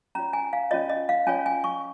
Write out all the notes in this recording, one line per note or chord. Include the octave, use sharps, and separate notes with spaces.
C#4 F4 C#5 A#5
G#5
F5
C#4 F4 C#5 D#5
D#5
F5
C#4 F4 C#5 G#5
G#5
C#6